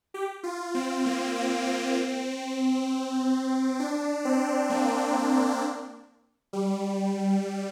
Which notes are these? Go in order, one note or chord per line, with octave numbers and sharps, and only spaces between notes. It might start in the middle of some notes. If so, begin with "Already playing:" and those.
G4
F4
C4
A#3
C4
C4
D4
C4
A#3
G3